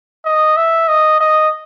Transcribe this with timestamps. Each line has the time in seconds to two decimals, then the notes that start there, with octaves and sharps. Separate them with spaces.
0.25 D#5
0.57 E5
0.88 D#5
1.20 D#5